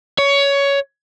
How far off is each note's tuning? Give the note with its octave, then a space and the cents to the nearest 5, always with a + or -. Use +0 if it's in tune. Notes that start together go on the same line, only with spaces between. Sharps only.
C#5 +15